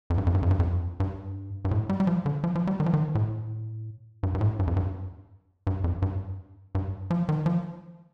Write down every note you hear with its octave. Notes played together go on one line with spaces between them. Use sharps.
F2
G2
F2
G2
F2
G2
F2
G2
G2
A2
G3
G3
F3
D3
F3
F3
G3
D#3
F3
D#3
A2
G2
G2
A2
G2
F2
G2
G2
F2
G2
G2
F3
D#3
F3